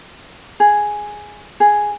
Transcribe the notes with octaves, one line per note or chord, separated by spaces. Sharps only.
G#4
G#4